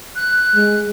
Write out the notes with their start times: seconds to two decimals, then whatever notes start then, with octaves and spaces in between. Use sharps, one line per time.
0.16 F#6
0.55 G#3